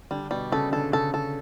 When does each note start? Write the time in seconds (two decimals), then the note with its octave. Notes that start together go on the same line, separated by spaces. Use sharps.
0.11 D3 G3
0.31 B2 G3
0.52 C#3 A4
0.72 D3 A4
0.92 C#3 A4
1.14 A4